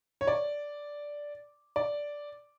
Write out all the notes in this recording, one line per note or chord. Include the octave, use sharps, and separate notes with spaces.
C#5
D5
D5